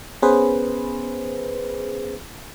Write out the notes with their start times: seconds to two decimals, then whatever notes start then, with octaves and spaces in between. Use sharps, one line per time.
0.22 B3 C#4 G#4 B4 C5